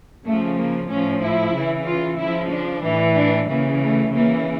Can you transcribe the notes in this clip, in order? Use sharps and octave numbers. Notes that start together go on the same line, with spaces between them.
C#3 F3 A3
A#3
A2 F3 C#4
E4
C#3 E3
F4
C#3 F3 E4
D4
A2 E3
D4
C#3 E3 A#3
A3
C#3 E3 A#3